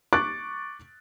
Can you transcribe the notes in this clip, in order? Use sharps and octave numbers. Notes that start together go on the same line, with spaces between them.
C#6 D6 F#6 A6 D7